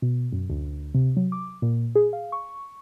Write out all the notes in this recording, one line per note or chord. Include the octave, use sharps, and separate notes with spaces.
B2
F#2
D2
C3
F#3
D6
A#2
G#4
F5
C#6